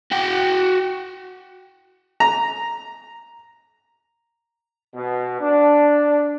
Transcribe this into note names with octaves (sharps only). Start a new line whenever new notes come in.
F#4 G5
A#5
B2
D4